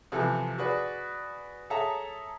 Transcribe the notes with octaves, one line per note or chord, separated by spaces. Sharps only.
C3 E3 F3 A4
F#4 G#4 B4 D5
G#4 A4 C#5 E5 A5 A#5